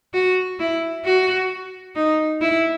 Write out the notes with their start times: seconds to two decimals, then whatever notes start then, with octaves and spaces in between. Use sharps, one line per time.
0.13 F#4
0.60 E4
1.05 F#4
1.96 D#4
2.41 E4